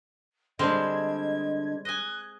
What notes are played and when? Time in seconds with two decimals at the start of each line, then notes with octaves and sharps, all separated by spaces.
0.59 D3 G3 G#3 C4 D4 D#5 G#6
1.85 D#5 G#5 F#6